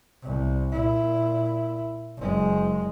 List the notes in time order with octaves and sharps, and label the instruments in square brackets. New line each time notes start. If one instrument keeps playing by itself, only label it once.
[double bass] C2
A#2 E4
F#1 G#3